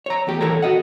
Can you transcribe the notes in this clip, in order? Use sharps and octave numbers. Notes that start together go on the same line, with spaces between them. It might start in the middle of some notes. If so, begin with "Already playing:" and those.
C#5 A#5
E2 A3 G4
D#2 E3 A4 A#4 C#5 A#5
F#4 D#5 F#5